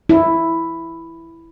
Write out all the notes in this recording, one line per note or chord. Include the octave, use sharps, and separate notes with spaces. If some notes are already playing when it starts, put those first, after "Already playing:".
E4